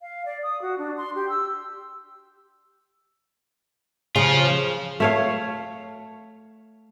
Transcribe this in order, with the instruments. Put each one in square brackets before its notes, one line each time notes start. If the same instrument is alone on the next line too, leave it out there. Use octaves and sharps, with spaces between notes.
[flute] F5
D5
D#6
F#4
D4
C6
G4
E6
[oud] C#3 [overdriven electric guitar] F3 F4
[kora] A3 C#5 F5